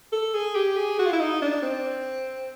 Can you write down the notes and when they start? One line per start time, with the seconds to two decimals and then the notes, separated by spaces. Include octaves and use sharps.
0.12 A4
0.34 G#4
0.55 G4
0.77 G#4
0.99 F#4
1.06 F4
1.13 E4
1.20 D#4
1.42 D4
1.62 C4